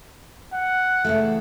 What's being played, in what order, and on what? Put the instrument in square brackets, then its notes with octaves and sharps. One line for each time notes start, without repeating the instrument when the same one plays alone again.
[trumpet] F#5
[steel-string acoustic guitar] C#3 E3 A3